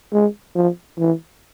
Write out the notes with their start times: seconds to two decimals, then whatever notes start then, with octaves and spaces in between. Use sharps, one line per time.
0.13 G#3
0.55 F3
0.99 E3